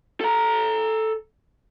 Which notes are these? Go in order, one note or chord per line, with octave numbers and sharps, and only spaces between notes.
A4 A#5